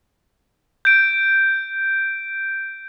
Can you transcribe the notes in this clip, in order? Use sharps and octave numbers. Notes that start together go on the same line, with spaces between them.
G6 D7